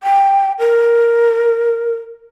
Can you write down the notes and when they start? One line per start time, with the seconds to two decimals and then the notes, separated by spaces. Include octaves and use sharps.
0.03 G5
0.59 A#4